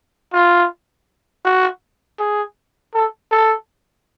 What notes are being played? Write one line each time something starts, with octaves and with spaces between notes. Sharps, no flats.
F4
F#4
G#4
A4
A4